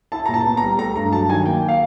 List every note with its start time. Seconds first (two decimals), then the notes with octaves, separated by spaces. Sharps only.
0.12 E4 A5
0.26 A#2 A#5
0.34 A5
0.46 B3
0.57 A#5
0.63 G3
0.78 A3 A#5
0.96 G2 A#5
1.12 F#3 A5
1.29 D#3 G#5
1.46 A#3 G5
1.68 F5